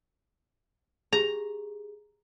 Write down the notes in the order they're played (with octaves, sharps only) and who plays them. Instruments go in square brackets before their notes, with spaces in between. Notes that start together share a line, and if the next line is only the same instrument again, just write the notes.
[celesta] G4 G#4 [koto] A#5